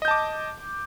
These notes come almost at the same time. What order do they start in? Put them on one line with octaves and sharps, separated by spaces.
D#5 G6 A5 D6